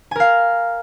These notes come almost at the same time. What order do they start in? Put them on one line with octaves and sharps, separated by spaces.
G#5 A#4 F5